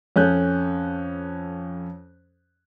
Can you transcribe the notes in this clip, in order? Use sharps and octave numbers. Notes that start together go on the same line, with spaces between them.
F2 C#4 A4 F#6 G6